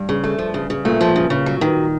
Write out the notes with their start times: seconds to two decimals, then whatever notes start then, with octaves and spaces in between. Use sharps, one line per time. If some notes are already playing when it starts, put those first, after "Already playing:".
Already playing: G2
0.09 C#3
0.24 A3
0.39 F3
0.54 C#3
0.70 C#3
0.85 A#2 A3
1.01 F3
1.16 C#3
1.30 C#3
1.46 F#3
1.61 D#3